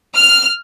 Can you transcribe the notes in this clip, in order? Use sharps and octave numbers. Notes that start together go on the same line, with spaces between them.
F6